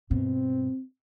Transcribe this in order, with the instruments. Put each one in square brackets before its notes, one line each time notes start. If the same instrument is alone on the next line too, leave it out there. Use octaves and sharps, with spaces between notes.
[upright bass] G2 B2 [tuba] C4